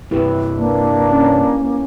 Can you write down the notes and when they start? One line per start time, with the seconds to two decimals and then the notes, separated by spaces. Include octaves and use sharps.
0.11 G2 C3 E4 G4 B4
0.58 A#3 D4
1.11 C#4